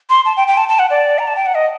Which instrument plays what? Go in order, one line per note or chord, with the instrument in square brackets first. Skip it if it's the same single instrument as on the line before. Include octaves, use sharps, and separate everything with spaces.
[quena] C6
A5
G5
G5
A5
A5
F#5
D5
A#5
A5
G5
F#5
D#5